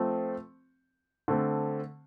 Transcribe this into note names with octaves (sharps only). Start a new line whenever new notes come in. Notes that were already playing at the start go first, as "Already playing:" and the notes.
Already playing: F3 A3 C4
D3 A3 C4